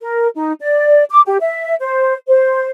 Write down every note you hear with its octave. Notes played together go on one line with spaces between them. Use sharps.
A#4
D#4
D5
D6
G4
E5
C5
C5